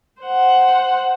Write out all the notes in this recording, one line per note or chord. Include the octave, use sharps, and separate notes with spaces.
C5 F#5